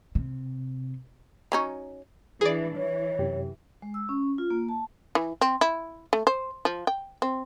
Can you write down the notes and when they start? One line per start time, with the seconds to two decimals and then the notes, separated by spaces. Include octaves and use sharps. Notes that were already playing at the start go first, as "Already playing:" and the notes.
0.15 C3
1.52 F#3 C#4 D#4
2.41 E3 D4 G#4 B4 D5
2.77 E3 C#5
3.19 F#2 C3 G4
3.82 G#3
3.94 E6
4.09 C#4
4.38 F4
4.50 A#3
4.69 A5
5.15 E3
5.41 C4
5.61 E4
6.13 A3
6.27 C5
6.65 F3
6.87 G5
7.22 C4